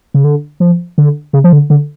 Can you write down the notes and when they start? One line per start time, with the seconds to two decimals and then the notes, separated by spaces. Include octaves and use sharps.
0.14 C#3
0.24 D3
0.60 F3
0.98 D3
1.33 C#3
1.44 F3
1.53 D3
1.70 D3